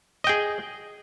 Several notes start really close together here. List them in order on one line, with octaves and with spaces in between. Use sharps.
D#5 G5 G#4